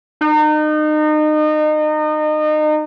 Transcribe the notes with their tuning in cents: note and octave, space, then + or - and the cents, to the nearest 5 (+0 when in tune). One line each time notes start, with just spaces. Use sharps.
D#4 -30